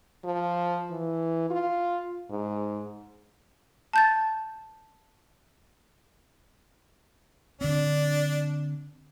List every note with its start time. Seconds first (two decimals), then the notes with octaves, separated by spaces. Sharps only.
0.25 F3
0.91 E3
1.50 F4
2.30 G#2
3.93 A5 G6 A6
7.61 D3 C4 D4